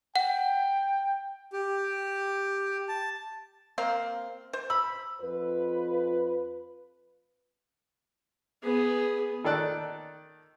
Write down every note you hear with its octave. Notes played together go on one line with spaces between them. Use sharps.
F#5 G5
G4
A5
A#3 C4 F5
C5
B5 E6
F2 F4 B4
B3 G#4
D#3 A4 D5 F#6